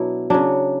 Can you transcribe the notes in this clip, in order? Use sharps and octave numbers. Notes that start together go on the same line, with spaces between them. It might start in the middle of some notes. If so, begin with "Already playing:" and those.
Already playing: B2 F#3 D4 E4
C#3 F#3 D4